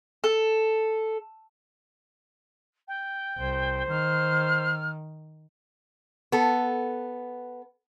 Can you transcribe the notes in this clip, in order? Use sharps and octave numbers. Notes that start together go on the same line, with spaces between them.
A4
G5
C2 C5
D#3 F6
B3 A4